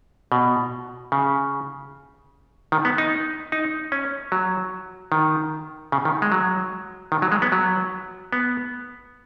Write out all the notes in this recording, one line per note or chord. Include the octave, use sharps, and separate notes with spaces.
B2
C#3
D#3
B3
D#4
D#4
C#4
F#3
D#3
C#3
D#3
G#3
F#3
D#3
F#3
G#3
B3
F#3
B3